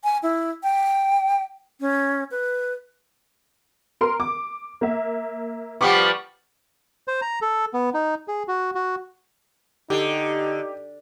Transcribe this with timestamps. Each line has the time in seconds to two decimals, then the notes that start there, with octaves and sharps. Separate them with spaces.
0.04 G#5
0.23 E4
0.64 G5
1.80 C#4
2.31 B4
4.01 A#4 C6
4.20 D6
4.81 A#3 E5
5.81 F3 G3 B3 C#6 D6
7.08 C5
7.22 A#5
7.42 A4
7.74 B3
7.94 D#4
8.28 G#4
8.48 F#4
8.75 F#4
9.90 D3 D#4 G4